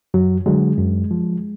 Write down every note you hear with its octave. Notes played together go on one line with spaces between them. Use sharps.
F#2 F#3
D3 F#3 G#3
F#2
F3